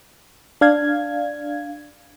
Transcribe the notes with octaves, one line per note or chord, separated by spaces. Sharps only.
D4 F5 G#6